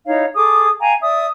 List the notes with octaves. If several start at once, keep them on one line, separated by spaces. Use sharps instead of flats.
D#4 E4 C#5 F5
G#4 A4 D6 D#6
F5 G5 G#5 A#5
D5 E5 D#6